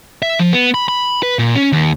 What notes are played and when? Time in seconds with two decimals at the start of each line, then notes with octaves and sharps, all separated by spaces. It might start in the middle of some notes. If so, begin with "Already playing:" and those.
0.22 E5
0.39 F3
0.53 B3
0.74 B5
0.88 B5
1.23 B4
1.39 A#2
1.55 C#4
1.72 D#2